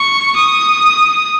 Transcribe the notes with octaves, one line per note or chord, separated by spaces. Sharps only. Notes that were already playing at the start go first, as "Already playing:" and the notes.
Already playing: C#6
D#6